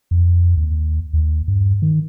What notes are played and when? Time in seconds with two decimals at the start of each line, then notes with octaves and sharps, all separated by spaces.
0.11 F2
0.57 D#2
1.13 D#2
1.48 G2
1.82 D#3